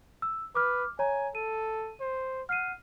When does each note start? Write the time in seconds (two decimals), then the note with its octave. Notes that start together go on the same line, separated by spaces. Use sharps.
0.22 E6
0.55 B4 D6 F6
0.99 C#5 G#5 A#5
1.35 A4 D#7
2.01 C5
2.49 F#5 F6 C7 D#7